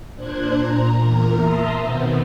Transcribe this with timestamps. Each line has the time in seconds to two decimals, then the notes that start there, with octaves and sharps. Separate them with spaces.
0.15 A#2 D4 C5 F#6 G#6
0.55 A#2 A#5
0.93 E2 A#2 A#4
1.38 E5 A5 A#5 C6 D#6
1.78 B2 D#3 B3 C4